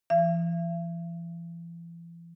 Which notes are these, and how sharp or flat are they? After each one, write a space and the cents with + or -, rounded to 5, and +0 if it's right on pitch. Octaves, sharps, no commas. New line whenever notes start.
E3 +40 E5 +45